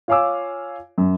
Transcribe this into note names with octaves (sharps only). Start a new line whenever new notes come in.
F4 C#5 F5 G#5 D6 E6
F#2